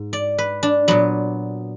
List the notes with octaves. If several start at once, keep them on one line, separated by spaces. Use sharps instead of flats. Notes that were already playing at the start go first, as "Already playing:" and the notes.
Already playing: G#2
D5
B4
D4
A#2 F#3 B3